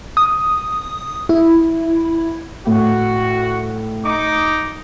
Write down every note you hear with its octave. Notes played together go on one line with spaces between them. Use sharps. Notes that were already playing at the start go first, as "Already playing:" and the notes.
D#6
E4
A2 F#4
D#4 D6